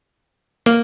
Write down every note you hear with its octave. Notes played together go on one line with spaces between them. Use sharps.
A#3